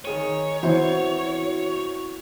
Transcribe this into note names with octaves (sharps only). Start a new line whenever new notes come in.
D#3 G#4 C#5 D#7
E3 B3 C4 E4 F#4 C5